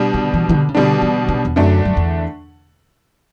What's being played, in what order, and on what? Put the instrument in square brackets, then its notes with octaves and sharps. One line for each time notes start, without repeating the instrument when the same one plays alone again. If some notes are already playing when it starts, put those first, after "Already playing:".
Already playing: [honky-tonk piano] B2 G3 D4
[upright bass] D3
E3
E3
D3
C#3
[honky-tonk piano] B2 G3 D4 [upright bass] D3
[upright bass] E3
C#3
E2
[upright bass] F#2 [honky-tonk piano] D3 A3 D4
[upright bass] F#2
E2